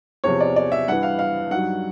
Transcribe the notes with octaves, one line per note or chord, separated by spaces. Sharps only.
E2 C3 F3 C#5
D5
D5
E5
G2 E3 F#5
F5
F5
G2 D#3 F#3 F#5